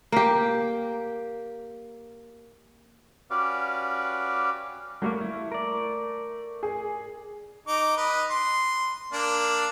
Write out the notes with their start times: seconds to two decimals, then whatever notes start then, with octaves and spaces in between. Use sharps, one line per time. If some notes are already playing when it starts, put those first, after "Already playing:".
0.12 A#3 G4
3.30 C#4 F#4 G4 B4 D5 F5
5.02 F#3 G3 A3 A#3
5.21 E4
5.52 A#4 D5
6.63 G#4
7.67 D#4 D6
7.97 B4 D#5
8.30 C6
9.13 A#3 D4 D5